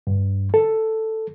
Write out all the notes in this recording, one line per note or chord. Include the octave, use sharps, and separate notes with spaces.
G2
A4